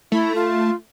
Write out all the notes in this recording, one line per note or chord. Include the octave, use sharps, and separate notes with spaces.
A3 E4
F4